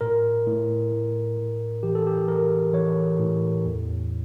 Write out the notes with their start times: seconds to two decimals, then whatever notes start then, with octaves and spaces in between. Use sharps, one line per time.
0.01 A2 A#4
0.47 A2
0.92 A2
1.38 A2
1.83 E3 G4
1.95 A4
2.07 G4
2.28 E3 A#4
2.73 E3 C#5
3.19 A2
3.65 E2